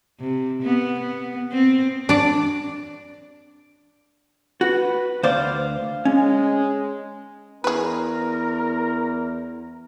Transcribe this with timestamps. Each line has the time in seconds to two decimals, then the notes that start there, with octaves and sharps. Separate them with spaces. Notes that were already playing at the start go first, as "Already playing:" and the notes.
0.20 C3
0.62 B3
0.99 B3
1.52 C4
2.09 D4 D5
4.61 F#4 B4
5.23 D2 C5 D5 F5
6.05 G#3 C#4
7.64 E2 G#4 A#4 B4